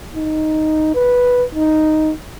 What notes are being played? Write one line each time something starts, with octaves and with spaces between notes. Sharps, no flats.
D#4
B4
D#4